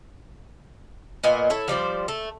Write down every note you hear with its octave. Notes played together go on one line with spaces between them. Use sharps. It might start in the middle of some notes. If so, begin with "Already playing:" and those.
A#2 B3 D#5 G#5
E4 A4 C#5
F3 G3 C5 D5
A3